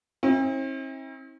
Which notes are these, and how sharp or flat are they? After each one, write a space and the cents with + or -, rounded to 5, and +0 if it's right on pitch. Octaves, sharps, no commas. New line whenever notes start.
C4 +45 E4 -45